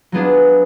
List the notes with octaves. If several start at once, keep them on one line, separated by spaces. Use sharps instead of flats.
F#3 B3 D4 F4 G#4